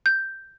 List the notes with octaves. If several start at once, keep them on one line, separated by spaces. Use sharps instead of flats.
G6